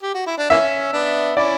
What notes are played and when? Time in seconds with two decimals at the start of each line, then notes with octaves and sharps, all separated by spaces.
0.02 G4
0.14 F#4
0.26 E4
0.37 D4
0.50 E3 A#3 C#4 E5
0.93 B3 D4
1.37 C#4 E4 D5